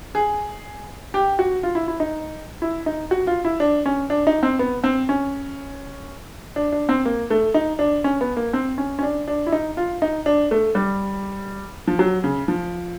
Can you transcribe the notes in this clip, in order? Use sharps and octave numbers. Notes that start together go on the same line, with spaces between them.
G#4
G4
F#4
F4
E4
E4
D#4
E4
D#4
F#4
F4
E4
D4
C#4
D4
D#4
C4
B3
C4
C#4
D4
D4
C4
A#3
A3
D#4
D4
C#4
B3
A#3
C4
C#4
C#4
D4
D4
E4
D#4
F4
D#4
D4
A3
G3
F3
F#3
C#3
F3